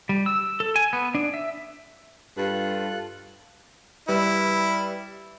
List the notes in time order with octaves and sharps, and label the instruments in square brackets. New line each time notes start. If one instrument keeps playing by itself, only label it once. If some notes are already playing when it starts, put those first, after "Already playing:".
[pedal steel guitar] G3
E6
A4
G#5
B3
D4
E5
[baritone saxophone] G2 [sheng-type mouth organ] F4 A4 F#6
[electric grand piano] G3 B4 [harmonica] E4